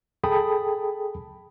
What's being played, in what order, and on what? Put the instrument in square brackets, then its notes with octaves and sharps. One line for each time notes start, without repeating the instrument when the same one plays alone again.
[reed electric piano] G#4 A4 G5 A5 B5 D#6